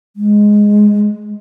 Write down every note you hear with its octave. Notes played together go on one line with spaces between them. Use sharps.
G#3